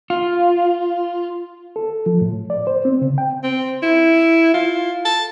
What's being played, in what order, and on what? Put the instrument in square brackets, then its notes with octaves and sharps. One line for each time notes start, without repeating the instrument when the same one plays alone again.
[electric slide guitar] F4
[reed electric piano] A4
F3
A2
D5
C5
C4
C#3
G5
[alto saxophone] C4
E4
F4
A5